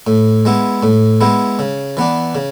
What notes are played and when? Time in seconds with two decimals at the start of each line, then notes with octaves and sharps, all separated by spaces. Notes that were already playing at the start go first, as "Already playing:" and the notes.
0.07 A2
0.45 G#3 B3 E4
0.83 A2
1.21 G#3 B3 E4
1.59 C#3
1.97 E3 B3 D4
2.35 C#3